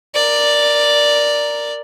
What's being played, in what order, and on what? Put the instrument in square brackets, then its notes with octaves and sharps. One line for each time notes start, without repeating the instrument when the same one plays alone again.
[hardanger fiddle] A#4 D5